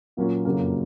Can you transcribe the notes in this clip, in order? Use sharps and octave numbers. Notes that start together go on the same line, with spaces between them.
A#2 F#3 A#3 C#4 F4
F#1 F2 C#3 F#3 A#3